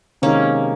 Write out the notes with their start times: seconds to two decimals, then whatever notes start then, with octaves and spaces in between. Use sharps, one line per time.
0.22 C3 D#3 G#3 A#3 C#4 D#4